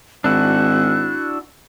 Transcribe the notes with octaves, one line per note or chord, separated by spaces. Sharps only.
G#1 D4 E4 F#4 F#6